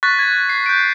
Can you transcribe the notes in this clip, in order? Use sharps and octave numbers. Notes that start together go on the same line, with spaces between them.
C#6 F#6 A6 B6
G#6
C7
G6 D7